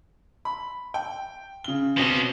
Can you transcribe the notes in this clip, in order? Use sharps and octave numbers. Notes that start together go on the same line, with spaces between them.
B5
G5
C#3 G7
B2 C4 C#4 D#5 E7